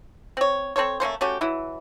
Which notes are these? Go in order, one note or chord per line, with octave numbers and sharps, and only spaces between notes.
C4 C#5
C4 A4 C5 C#5
A3 A#3 C#4 C5
A3 C#4 F#4 G4
E3 F#3 E4